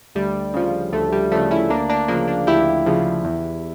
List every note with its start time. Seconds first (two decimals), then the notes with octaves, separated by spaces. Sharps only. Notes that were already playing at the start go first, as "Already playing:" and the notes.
0.15 D2 G3
0.54 C#3 F3
0.93 D2 A3
1.12 G3
1.31 C#3 F3 A3
1.51 C#4 E4
1.70 D2 A#3 D4
1.89 A#3 D4
2.08 C#3 F3 A#3 D4
2.28 A#3 D4
2.47 D2 E4 G4
2.86 C#3 F3
3.25 E2